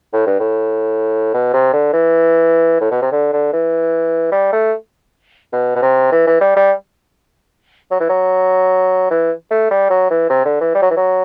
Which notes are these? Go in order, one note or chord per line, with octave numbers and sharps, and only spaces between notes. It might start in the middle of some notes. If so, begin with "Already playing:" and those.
A2
G2
A2
B2
C3
D3
E3
A2
B2
C3
D3
D3
E3
G3
A3
B2
B2
C3
E3
E3
G3
G3
F#3
E3
F#3
E3
A3
G3
F#3
E3
C3
D3
E3
G3
F#3
E3
F#3